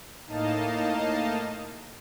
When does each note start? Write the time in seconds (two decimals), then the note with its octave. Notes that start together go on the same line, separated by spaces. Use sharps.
0.26 A2 A#3 D#4 D#5 F5 A5